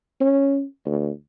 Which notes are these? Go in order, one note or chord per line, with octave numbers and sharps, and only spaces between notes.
C#4
D2